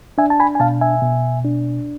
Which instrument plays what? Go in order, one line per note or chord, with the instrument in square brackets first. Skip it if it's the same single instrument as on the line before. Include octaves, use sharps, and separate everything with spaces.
[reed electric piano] D4 E5 G#5
A5
G#5 B5
G#5
B2 F5 A5
E5 G#5
B2
D4